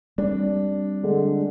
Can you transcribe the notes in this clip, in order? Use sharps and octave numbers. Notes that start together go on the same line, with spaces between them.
G3 C4 D4
D3 G#3